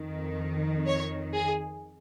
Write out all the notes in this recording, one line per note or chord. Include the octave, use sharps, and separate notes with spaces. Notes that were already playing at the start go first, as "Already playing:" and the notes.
Already playing: F2 D#3
C#5
G#4